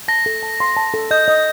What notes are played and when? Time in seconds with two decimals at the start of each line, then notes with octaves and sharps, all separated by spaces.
0.08 A5 A#6
0.26 A4
0.43 A5
0.60 C6
0.77 A5
0.94 A4
1.11 D#5 G6
1.28 D#5